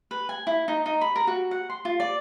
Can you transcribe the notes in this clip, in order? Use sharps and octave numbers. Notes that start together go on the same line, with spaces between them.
B4
G#5
E4
D#4
D#4
B5
A#4
F#4
F#5
C6
F4
D5